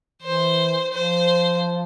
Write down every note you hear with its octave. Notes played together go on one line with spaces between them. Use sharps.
E3 C5
F3 C5